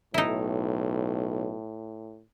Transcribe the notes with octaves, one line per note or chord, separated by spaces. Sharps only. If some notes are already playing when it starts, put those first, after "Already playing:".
B1 A2 D#4 E4